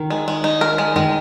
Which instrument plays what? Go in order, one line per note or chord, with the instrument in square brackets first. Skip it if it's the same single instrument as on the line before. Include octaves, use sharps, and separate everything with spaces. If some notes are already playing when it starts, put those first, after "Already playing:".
Already playing: [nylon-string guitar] D#3
[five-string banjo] G#3
G#3
D#4
A#4
G#3
[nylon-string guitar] D#3 [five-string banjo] G#3